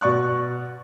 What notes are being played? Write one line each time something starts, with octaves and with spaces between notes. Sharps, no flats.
B2 D5 C#6 F#6